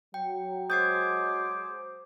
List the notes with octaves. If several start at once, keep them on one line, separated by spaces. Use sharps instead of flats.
F#3 G5
G#3 C5 D6 D#6 G6 G#6 C7